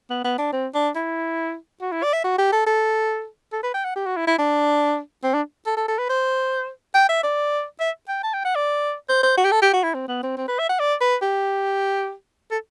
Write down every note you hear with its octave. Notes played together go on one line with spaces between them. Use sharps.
B3
B3
D4
C4
D4
E4
F#4
E4
D5
E5
F#4
G4
A4
A4
A4
B4
G5
F#5
G4
F#4
E4
E4
D4
C4
D4
A4
A4
A4
B4
C5
G5
E5
D5
E5
G5
A5
G5
F#5
D5
C5
C5
F#4
G4
A4
G4
F#4
E4
C4
B3
C4
C4
B4
E5
F#5
D5
B4
G4
A4